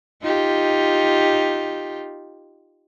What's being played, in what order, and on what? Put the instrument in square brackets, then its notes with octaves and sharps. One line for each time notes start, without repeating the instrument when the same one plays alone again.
[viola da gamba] D#4 F4 G4